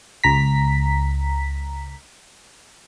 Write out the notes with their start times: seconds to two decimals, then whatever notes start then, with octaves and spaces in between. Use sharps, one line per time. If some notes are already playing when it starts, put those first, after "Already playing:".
0.24 C#2 A#5 B6